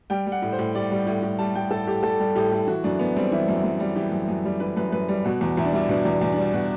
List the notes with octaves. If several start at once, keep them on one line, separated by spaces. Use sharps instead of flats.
G3 G5
G3
F#5
A2
C5
A2
G3 D5
G3
A2
A2
G3 A5
G3 G5
A2 A4
A2 G4
G3 A4
G3
A2 G4
A2
E3 F#4
F#2 D4
F#2 B3
G3 C4
E3 E4
F#2
F#2
G3
E3 G4
F#2
F#2
G3
E3 B4
F#2 B4
F#2 B4
G3
B2 F#4
E2
E2 E4
D4
G3 E4
B2 D4
E2
E2
D4
G3
B2 F#4